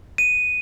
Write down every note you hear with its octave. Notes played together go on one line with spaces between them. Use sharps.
D#7